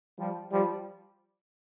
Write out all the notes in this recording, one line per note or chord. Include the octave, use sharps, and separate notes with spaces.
F3 G3
F3 G3